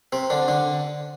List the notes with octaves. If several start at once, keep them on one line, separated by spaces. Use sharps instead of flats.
C3 C4
D3 D4
D3 D4